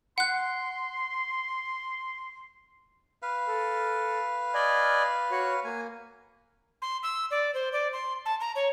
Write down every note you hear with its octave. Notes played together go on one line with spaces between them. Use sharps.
F#5 C6 F#6
B4 F5
A4
D5 D#5 G#5
F#4 C#5
A#3 G#5
C6
E6
D5
C5
D5
C6
A5
A#5
C#5